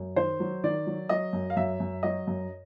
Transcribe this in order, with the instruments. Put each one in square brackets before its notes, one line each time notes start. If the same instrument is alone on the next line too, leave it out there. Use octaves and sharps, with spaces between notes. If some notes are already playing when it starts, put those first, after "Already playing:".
Already playing: [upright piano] F#2
D#3 C5
F#3
D#3 D5
F#3
F#3 D#5
F#2
F5
F#2 E5
F#2
F#3 D#5
F#2